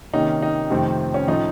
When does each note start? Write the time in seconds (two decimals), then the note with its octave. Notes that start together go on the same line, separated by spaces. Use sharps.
0.13 C3 D#3 A#3 C#4 D#4
0.42 D#4
0.70 F2 C3 D#3 A3 C4
1.14 C#4
1.28 A2 F3 A3 C#4 D#4